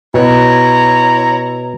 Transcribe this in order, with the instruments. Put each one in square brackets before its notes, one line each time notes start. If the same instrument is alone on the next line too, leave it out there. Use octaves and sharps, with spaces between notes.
[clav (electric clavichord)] B2 [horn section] E4 C#5 A#5